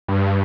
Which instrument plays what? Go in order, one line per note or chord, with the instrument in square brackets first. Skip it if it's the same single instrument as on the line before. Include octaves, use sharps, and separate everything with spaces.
[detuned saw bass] G2